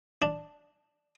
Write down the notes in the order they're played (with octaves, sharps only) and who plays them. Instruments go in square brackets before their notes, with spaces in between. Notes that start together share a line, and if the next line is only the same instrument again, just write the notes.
[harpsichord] D4